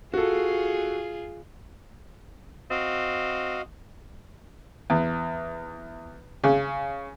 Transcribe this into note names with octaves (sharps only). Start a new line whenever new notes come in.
F4 F#4 G#4 A4
C4 F#4 D#5 F5
E2
C#3